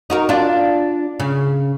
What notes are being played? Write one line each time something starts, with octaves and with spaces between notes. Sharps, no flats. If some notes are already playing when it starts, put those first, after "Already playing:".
D#4 F#4 A#4
D4 F4
C#3